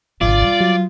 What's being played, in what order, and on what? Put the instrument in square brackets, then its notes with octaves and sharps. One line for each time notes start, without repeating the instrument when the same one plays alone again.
[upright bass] G#1 D3 [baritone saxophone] F4 [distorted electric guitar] D5
[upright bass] G3
[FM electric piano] F#3